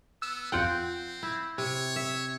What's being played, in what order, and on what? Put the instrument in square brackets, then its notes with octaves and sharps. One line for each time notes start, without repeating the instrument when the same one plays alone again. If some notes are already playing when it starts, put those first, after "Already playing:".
[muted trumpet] B3 [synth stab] E6
[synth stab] F2 F4 G5 [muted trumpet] C4 [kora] F#5
[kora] E4
[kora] C3 [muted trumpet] C#5
[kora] E5